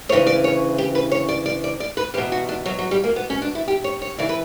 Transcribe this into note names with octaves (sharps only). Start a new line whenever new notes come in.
D2 C#3 E3 C#5
D5
C#5
G4
B4
C#5
D5
D5
D5
D5
B4
E2 B2 G4
F#4
D4
F#3
F#3
G3
A#3
B3
C#4
D4
E4
G4
C#5
C#5
C#3 E3 D5
B4